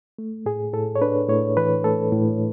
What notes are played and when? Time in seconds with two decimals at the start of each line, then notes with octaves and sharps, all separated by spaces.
0.18 A3
0.46 A2 G#4
0.74 A2 A4
0.96 C#5
1.02 D4 B4
1.29 A2 C#5
1.57 E3 B4
1.84 A3 A4
2.12 A2